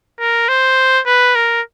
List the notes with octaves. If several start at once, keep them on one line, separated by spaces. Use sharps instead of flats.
A#4
C5
B4
A#4